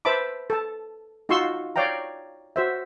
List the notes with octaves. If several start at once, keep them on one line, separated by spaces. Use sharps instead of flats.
B4 C5 E5 A5 B5 D6
A4 A5
D#4 F4 F#4 C6 C#6 E6
C#5 D5 F5 G5 A#5
F#4 C5 E5